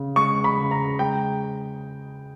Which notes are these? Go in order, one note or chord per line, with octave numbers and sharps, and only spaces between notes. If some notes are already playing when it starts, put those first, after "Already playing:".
Already playing: C#3
G#3 C#6
B5
C#3
A#5
G#3 G5